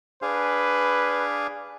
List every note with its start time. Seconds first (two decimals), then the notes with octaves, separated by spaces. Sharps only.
0.22 D4 G#4 B4 F5